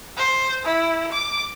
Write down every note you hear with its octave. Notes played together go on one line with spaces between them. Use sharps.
C5
E4
D6